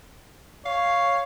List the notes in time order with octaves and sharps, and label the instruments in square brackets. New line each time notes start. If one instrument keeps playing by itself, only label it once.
[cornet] C#5 [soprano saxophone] F5